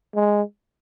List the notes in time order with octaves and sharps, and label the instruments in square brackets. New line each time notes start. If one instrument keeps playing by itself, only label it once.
[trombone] G#3